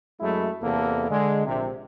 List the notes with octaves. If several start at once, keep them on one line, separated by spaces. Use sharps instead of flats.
F#2 F#3 G#3 A3 E4
E2 C3 A#3 A4
D3 G#3
A#1 C3